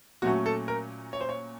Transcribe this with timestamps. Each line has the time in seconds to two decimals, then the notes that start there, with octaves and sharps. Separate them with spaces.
0.22 A#2 F#3 A3 C#4 F#4
0.46 A4
0.68 A#4
1.13 C#5
1.21 C5
1.29 C#5